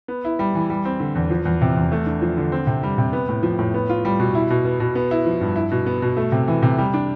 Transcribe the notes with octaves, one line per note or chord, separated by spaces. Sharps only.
B3
E4
G3
E3
G3
C4
D3
E2
F3
E2
C3
E2
A3
D4
F3
D3
C4
C3
G3
C3
B3
A2
F3
A2
B3
F4
G3
B2
E4
B2
B3
B2
B3
E4
F3
G2
E4
B2
B3
B2
A3
C3
E3
C3
G3
D4